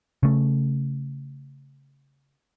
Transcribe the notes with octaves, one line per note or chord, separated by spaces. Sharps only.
C#3 A3